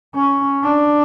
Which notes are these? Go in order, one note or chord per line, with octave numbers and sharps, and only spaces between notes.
C#4
D4